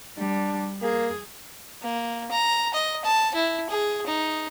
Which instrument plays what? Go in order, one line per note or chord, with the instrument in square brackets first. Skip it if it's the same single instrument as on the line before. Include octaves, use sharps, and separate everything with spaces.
[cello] G3 [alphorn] D4
[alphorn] A#3 [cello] G#4
[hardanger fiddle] A#3
A#5
D#5
A5
E4
G#4
D#4